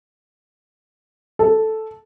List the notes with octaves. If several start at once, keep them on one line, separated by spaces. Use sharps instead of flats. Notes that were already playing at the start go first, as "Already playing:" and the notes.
A4